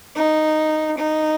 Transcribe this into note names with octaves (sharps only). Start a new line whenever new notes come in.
D#4
D#4